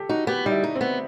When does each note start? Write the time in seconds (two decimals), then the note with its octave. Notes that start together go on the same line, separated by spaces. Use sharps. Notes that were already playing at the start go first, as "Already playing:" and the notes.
Already playing: G4 A4
0.09 D#4 F#4
0.27 B3 G4
0.46 G3 D#4
0.51 E4
0.64 D#4
0.76 C4
0.81 B3